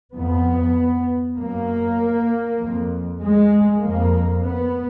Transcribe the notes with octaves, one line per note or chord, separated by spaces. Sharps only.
F2 B3
F#2 A#3
F2
G#3
F2 A#3
B3